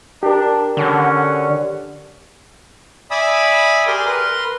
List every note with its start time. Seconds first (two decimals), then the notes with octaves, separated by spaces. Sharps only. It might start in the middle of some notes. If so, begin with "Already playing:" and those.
0.23 D4 G4 A#4
0.77 D3 C#4 F#4 F#5
3.11 D5 E5 G#5 B5 D#6 E6
3.87 G4 G#4 A#4 D5 G#5 C6
4.06 A#4 B4 C6